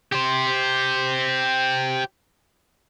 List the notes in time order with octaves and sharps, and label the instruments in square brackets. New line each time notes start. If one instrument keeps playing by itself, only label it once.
[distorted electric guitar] G4 C5